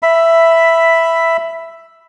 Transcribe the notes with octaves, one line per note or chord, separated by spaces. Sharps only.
E5 B5